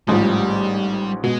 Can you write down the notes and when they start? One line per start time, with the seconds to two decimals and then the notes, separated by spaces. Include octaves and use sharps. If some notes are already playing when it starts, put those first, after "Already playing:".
0.08 A1 G#2 F3 G3
1.24 B2 G#3